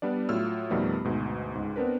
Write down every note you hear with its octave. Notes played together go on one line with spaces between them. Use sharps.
G3 B3 D4 D5
A2 F#3 F4 E6 F6
F2 B2 D#3 G3 A3 B3
D2 G#2 B2
C#2 G#2
B3 C4 D4 A#4 B4